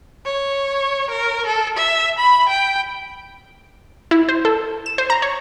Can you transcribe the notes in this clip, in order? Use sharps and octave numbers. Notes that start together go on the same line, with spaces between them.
C#5
A#4
A4
E5
B5
G5
E4
C5
A4
E7
C5
A#5
C#5